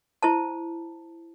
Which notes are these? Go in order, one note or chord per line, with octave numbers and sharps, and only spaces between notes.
E4 C5 A5